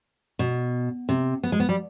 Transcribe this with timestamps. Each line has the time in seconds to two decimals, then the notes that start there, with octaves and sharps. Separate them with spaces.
0.39 B2
1.09 C3
1.43 B3
1.52 G#3
1.60 B3
1.69 G3